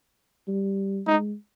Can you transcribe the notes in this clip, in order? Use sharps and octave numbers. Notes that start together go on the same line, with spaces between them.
G3
G#3 D#4